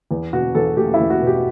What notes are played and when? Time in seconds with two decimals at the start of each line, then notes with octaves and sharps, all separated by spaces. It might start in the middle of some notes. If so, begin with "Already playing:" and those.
0.11 E2
0.33 B2 F#4
0.55 E2 A4
0.77 A3 G4
0.94 E4
0.99 E2
1.10 F#4
1.22 B2
1.27 G4